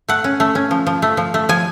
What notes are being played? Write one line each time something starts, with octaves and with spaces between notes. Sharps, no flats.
A3 F#5
C#4
A3
C#4
F3
F3
A3
F3
A3
F3 G#5